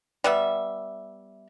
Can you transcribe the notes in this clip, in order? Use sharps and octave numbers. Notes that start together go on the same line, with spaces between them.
G3 B3 E5